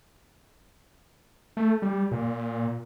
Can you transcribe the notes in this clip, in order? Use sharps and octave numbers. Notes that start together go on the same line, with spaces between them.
A3
G3
A#2